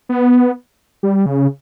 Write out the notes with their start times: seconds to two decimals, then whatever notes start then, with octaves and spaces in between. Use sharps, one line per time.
0.09 B3
1.03 G3
1.26 C#3